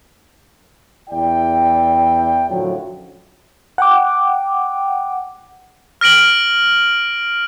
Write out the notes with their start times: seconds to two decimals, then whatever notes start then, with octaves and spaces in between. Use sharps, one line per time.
1.10 E2 E4 D5 G5
2.50 F#2 A2 D3 F3 F#3
3.78 F#5 G5 D6
6.01 F6 A#6 D7 F#7